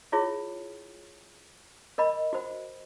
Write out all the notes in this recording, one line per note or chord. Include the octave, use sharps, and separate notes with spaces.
E4 F4 G#4 C#5
A#4 D#5 B5
F#4 C5